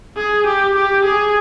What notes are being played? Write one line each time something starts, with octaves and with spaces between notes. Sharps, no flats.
G#4
G4
G4
G#4